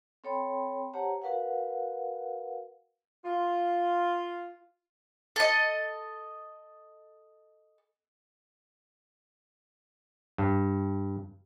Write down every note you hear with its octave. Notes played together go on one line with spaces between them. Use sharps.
C4 A4 C#5 G5 B5 C6
G4 C5 C#5 F#5 A5 A#5
F#4 A#4 B4 F5 F#5
F4
A4 D#5
G2